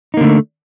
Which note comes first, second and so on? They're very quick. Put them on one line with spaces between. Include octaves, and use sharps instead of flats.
D#4 A#3 D3 A3